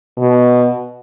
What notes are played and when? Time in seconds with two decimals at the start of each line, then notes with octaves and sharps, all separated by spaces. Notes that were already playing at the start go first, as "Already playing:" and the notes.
0.18 B2